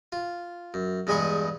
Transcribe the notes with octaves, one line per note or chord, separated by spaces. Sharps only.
F4
F#2
E2 G2 G#3 G#5 B5 C#6